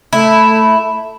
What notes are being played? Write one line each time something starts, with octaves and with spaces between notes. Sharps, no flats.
A3 E4